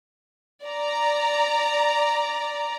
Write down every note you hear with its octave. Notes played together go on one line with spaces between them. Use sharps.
D5 A#5